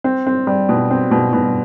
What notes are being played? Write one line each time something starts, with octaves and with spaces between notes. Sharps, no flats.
C4
C4
G3
B2
C4
B2
B2